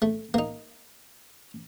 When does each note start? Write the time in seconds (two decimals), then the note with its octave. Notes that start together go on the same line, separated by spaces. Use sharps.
0.02 A3
0.34 A#3 D#4